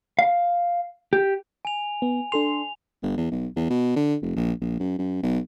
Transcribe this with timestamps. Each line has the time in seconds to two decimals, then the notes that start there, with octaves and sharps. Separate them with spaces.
0.19 F5
1.13 G4
1.65 G#5 F7
2.02 B3
2.32 D4 A4 C6 F7
3.03 G1
3.17 E2
3.31 B1
3.56 E2
3.70 B2
3.96 D3
4.22 F1
4.36 A#1
4.61 A#1
4.80 F#2
4.99 F#2
5.23 B1